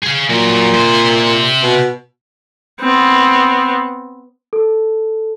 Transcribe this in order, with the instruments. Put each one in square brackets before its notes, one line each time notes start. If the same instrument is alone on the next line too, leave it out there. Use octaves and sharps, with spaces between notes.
[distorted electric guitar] G#4 F5
[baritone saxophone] A#2 [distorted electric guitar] F#3 A#4
[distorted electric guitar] C3 C5
[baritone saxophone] B2
[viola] B3 C4
[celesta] A4